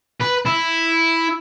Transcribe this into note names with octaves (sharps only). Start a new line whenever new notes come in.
B4
E4